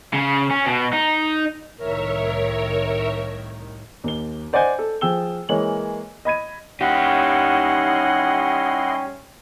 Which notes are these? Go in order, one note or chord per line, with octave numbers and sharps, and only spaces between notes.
C#3
C#4
B2
D#4
C2 A2 D#3 A#4 C#5 E5
D#2 G7
C5 D5 D#5 F#5 G#5 G6
A4
F3 G#4 G5 E6 G7
E3 G#3 A#3 C#5 F#7
D#5 B5 G#6 D#7
G3 C#4 D#4 E4 G4 D#5 F#5 C6